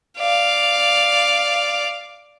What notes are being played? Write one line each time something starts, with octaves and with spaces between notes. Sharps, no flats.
D5 F5